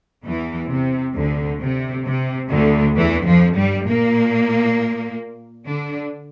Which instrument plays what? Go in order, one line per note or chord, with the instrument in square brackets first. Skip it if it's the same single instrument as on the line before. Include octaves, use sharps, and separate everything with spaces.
[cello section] E2 E3
C3
D2 D3
C3
C3
D2 D3
E2 E3
F2 F3
G2 G3
A#2 A#3
D3 D4